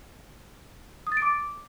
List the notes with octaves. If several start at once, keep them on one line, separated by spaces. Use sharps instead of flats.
D#6
A6
D7
D6